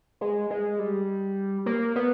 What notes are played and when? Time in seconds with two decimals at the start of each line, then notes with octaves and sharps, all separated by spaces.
0.21 G#3
0.50 G#3
0.79 G3
1.66 A#3
1.96 B3